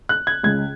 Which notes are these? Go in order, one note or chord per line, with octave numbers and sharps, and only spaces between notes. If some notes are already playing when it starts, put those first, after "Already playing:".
F#6
G#6
C#2 C#3 G#3 G#6